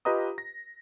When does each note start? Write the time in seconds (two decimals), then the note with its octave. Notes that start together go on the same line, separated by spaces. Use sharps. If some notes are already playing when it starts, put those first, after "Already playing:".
0.05 F4 G4 B4 D#5 A#5 D#6
0.38 A#6